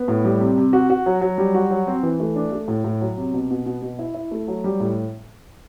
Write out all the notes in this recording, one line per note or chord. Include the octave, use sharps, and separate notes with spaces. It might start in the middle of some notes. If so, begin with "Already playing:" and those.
Already playing: B3
A2
G3
C3
C3
F#4
F#4
F#3
F#3
G3
F#4
F#3
C4
E3
A3
D4
A3
A2
A2
F#3
C3
B2
B2
B2
B2
E4
E4
A3
F#3
G3
A2